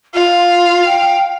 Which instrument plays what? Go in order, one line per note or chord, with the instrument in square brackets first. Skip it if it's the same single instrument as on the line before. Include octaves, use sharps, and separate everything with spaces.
[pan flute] F4 [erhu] F5
[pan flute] G5